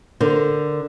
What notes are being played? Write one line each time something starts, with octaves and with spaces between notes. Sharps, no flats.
D3 A#4 C5